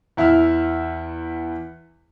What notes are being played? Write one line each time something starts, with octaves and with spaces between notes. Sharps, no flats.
E2 E4 E5 E6 F6